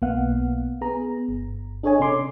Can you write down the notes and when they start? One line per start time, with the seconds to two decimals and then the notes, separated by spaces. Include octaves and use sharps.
0.02 B1 A#3 B3 F5 F#5
0.81 B3 G#4 A#5
1.28 G1
1.83 D4 G#4 A4 C#5 D#5 G#5
2.00 C3 C#4 C6 D6